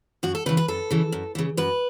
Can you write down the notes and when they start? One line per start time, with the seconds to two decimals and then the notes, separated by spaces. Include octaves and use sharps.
0.23 F#2 F#4
0.35 A4
0.46 C#3 B4
0.49 E3
0.57 B4
0.68 F#2 A4
0.90 C#3 E3
1.12 F#2
1.35 C#3 E3
1.57 F#2 B4